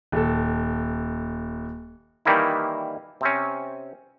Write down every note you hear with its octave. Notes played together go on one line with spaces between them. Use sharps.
D#1 A4
D#3 E3 G3 A#3 D#4 E4
C3 C4 C#4